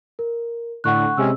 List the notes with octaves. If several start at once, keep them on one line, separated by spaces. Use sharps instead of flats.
A#4
A2 D3 F#5 C#6 F#6
C3 G#3 C#4 E6